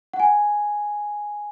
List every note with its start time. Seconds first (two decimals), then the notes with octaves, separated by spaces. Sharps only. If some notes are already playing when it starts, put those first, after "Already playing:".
0.13 F#5
0.20 G#5